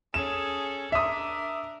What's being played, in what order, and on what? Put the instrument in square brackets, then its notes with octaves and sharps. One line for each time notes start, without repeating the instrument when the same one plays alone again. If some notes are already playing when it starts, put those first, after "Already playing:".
[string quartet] C#4 G#4 A4 [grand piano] E7
[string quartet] D4 A#4 [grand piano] E5 D#6